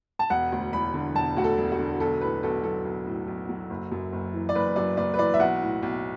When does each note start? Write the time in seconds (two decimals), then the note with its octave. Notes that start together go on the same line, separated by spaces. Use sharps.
0.19 A5
0.30 E1 F#5
0.52 D2
0.73 E1 B5
0.94 D3
1.15 E1 A5
1.37 D2 F#4
1.44 A4
1.58 E1
1.72 F#4
1.79 D3
2.00 B1 A4
2.21 A2 B4
2.43 B1 A4
2.64 F#3 A4
2.85 B1
3.06 A2
3.27 B1
3.49 F#3
3.70 F#1
3.92 F#2
4.13 F#1
4.34 E3
4.49 D5
4.55 F#1 B4
4.76 F#2 D5
4.97 F#1 D5
5.14 B4
5.19 E3 D5
5.34 E5
5.40 B1 F#5
5.62 A2
5.83 B1